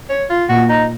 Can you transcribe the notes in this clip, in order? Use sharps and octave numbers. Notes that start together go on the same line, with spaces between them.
C#5
F4
A#2 F#4
D#4